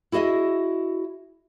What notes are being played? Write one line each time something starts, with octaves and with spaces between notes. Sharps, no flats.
E4 F#4 G#4 D#5 E5